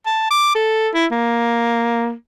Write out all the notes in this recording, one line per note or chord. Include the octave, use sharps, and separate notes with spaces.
A5
D6
A4
E4
A#3